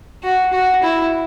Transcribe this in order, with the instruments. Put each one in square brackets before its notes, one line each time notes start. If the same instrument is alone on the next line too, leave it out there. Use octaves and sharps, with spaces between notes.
[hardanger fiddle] F#4
F#4
E4